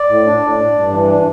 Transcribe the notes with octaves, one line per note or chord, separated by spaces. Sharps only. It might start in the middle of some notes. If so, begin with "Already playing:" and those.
Already playing: D5
A2
D4
A2
D4
G2
E3
D4